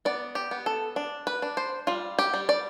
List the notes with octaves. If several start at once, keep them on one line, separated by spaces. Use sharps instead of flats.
B3 D5
G4
B3
A4
D4
B4
D4
C5
G3 F4
G4
G3
D5